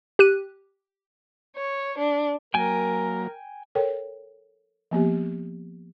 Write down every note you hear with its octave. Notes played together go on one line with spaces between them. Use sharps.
G4 F#6 D#7
C#5
D4
F#3 A#3 A#4 G5 G#5
A4 A#4 C#5 G5
F3 A#3 B3 G4